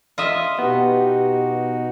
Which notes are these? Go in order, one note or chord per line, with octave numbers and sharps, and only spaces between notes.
F4 D#5 E5
B2 B3 D#4 F#4 G4